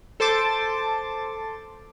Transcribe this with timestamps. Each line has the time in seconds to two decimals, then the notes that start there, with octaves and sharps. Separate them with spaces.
0.20 A4 C5 A5 C6 D6 A6